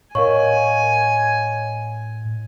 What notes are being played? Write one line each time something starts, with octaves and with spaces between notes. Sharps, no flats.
A2 A#4 C#5 D#5 F5 G#5 C#6